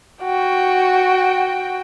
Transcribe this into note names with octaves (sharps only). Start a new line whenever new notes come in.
F#4 G5